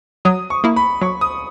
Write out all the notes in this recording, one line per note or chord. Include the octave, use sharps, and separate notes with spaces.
F#3 D#6
C#6
A#3 E4
B5
F#3 C#6
D#6